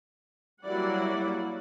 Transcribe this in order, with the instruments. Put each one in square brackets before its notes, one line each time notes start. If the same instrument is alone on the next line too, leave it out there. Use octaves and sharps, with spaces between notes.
[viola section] F#3 G3 A#3 E4 D5 F#5